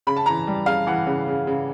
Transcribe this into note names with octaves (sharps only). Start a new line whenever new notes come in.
C#3 B5
A5
E3 A#5
G3
C#3 F5
E3 F#5
C#3
C#3
C#3